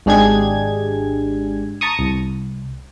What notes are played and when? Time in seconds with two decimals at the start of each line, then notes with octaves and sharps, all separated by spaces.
0.06 G#1 G#3 D4 G4 G#4 G#6
1.81 A5 A#5 C#6 D#6
1.99 C2